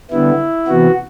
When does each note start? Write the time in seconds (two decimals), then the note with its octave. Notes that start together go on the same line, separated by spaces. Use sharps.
0.11 D3 G3 B3 E4
0.67 C3 E3 B3 F#4